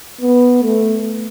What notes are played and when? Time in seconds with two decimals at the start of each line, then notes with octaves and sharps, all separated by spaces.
0.21 B3
0.63 A3